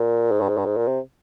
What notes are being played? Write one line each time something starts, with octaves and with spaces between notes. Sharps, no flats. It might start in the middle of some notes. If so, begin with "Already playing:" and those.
Already playing: A#2
G#2
G2
G#2
G2
G#2
A#2
C3